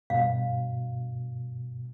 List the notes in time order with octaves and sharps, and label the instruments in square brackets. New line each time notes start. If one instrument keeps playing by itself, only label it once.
[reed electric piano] G2 B2 [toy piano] F5